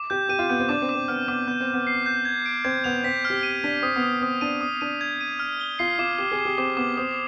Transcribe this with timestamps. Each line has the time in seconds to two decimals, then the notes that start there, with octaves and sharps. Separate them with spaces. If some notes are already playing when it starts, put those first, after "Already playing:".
Already playing: D6
0.10 G4 G6
0.29 G4 D#7
0.39 F4
0.49 B3 G6
0.60 C4
0.69 D4 D6
0.82 C4
0.89 D6
0.95 C4
1.08 B3 F6
1.28 B3 D6
1.47 B3 G6
1.60 C4
1.67 G6
1.74 B3
1.87 C7
2.06 G6
2.25 G#6
2.46 D7
2.65 C4 G#6
2.84 B3 F7
3.04 C4 B6
3.25 F6
3.30 G4
3.43 D#7
3.64 D4 B6
3.82 C4 D#6
3.96 B3
4.03 D#6
4.22 C4 D#6
4.41 D4 D#7
4.61 D#6
4.81 D4 D#7
5.01 G#6
5.21 D#7
5.39 F6
5.60 G7
5.79 F4 C7
5.99 F4 D6
6.18 G4 D6
6.32 G#4
6.39 D6
6.45 G4
6.58 C4 D6
6.77 B3 D6
6.97 C4 D#6